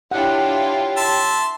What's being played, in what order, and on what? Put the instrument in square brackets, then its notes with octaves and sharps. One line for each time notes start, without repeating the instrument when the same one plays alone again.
[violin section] D4 E4 F4 [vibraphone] G4 C#5 G5 [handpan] F#5
[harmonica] E5 A5 C6